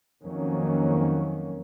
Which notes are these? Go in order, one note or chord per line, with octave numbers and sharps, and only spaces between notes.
F2 D#3 F#3 A#3 C#4